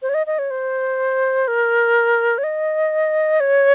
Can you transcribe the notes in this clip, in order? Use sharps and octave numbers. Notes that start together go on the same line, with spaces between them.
C5
C#5
D#5
D#5
C#5
C5
A#4
C#5
D#5
C#5